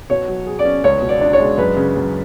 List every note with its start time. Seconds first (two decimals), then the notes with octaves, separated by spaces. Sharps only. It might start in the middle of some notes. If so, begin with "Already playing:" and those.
0.10 B2 C#5
0.28 F#3
0.47 G#4
0.59 D5
0.65 C#4
0.84 C#2 C#5
1.02 B2
1.09 D5
1.21 D4
1.33 C#5
1.39 G#3
1.58 F#2 B4
1.77 C#3
1.96 F#2